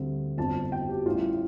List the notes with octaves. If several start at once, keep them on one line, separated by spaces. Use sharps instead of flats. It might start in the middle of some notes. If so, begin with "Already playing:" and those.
Already playing: D2 D3 G3 C4
G1 F2 F3 A5
G5
G4
A1 A2 G3 F4